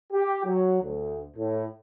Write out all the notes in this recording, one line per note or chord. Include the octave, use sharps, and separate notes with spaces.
G4
F#3
D2
A2